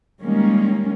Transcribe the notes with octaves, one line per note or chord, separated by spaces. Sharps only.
D#3 G3 G#3 A#3 C#4